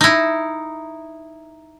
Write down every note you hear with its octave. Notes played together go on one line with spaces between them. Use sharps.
D#4 E4